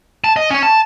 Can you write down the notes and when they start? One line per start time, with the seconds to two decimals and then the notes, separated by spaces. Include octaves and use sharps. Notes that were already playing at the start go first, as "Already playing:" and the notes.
0.24 A5
0.36 D#5
0.50 C#4 C#5
0.63 A5